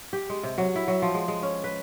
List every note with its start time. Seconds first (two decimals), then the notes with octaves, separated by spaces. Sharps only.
0.13 G4
0.29 G#3
0.43 C3
0.58 F#3
0.75 E4
0.88 F#3
1.02 F3
1.14 G#3
1.28 G#3
1.43 C#4
1.64 B4